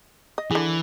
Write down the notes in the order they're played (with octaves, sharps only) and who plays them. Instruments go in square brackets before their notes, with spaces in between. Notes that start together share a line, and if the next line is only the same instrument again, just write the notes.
[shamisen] D#5
[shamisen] D3 G#4 [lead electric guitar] E3